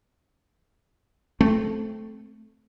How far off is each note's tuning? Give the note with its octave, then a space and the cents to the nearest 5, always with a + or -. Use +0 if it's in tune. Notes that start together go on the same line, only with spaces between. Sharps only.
A3 -10 C4 +0